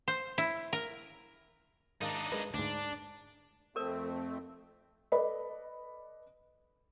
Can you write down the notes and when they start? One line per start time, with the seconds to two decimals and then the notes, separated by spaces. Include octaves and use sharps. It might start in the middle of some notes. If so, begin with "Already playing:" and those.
0.08 C5
0.38 E4
0.73 A#4
2.01 G#2 D#3 D4 D#4 F5
2.32 G#3 A#4 B4
2.54 D2 G#2 D4
3.76 F2 A3 C4 A4 A#4 D5
5.12 A4 B4 D5 D#5 B5